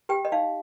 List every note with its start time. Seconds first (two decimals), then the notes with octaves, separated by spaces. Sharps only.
0.09 G4 G5
0.25 D#5
0.32 D#4 F5